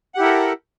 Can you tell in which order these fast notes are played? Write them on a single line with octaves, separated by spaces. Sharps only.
F#5 G4 E4 A#4 A4